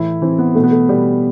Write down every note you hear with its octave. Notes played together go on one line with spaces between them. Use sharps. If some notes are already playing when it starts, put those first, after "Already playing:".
Already playing: A2 E3 E4
E3 C4
B3
B2 A3
B3
A3
B2 G3